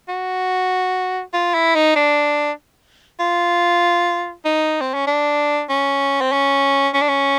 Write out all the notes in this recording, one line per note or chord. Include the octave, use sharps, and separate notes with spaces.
F#4
F4
E4
D#4
D4
F4
D#4
C4
C#4
D4
C#4
C4
C#4
C#4
D4
C#4